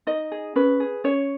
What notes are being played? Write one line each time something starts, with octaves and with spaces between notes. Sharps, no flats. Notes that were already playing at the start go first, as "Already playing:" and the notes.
D#4 D#5
G#4
C#4 B4
G#4
C#4 C#5